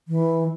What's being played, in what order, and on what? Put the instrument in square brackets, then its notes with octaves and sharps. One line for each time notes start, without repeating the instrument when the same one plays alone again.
[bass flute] E3